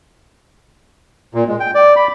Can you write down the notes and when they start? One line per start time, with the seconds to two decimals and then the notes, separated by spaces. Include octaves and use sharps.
1.34 A#2
1.48 G#3
1.60 G5
1.75 D5
1.96 B5